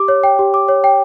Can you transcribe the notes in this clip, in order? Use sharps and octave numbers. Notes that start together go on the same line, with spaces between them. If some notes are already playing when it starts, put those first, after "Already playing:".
Already playing: G4 D6
C#5
G5
G4
D6
C#5
G5